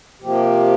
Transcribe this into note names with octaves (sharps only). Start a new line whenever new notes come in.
C3 F3 A#3 G4